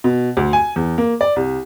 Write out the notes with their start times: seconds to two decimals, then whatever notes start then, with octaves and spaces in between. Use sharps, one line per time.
0.04 B2
0.37 D2
0.53 G#5
0.76 E2
0.98 A#3
1.21 D5
1.36 C2